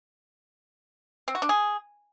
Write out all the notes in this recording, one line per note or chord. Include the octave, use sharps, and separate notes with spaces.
C4
F#4
D4
G#4